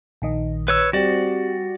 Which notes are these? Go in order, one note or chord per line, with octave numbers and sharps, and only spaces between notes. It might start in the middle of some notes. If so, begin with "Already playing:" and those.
A#1 D#3 D#5
B4 C#5 E6
G3 C4 F#4 G4 D5